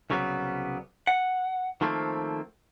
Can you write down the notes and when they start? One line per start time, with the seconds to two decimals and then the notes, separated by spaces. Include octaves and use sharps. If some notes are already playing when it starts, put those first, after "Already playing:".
0.10 C2 C#3 F#3 G3 B3
1.07 F#5
1.81 D#3 F3 A3 A#3 C4